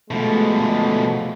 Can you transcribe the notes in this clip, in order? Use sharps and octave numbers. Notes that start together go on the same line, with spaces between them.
B2 F3 G#3 A3